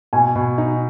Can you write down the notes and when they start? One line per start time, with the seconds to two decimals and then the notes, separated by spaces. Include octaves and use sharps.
0.13 B2 G#5
0.36 B2
0.58 D#4